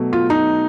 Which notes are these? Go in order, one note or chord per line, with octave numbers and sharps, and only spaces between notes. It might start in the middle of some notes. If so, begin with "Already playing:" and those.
Already playing: B2 F#3 A3
F4
D#4